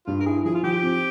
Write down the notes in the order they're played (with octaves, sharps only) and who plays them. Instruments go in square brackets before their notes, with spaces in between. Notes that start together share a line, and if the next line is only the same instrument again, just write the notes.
[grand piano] G2 [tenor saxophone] F4
[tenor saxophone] A#4
[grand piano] E4 [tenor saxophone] G#4
[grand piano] F3 [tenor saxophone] G#4
[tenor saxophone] F4
[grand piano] F3 [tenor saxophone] G4
[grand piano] C4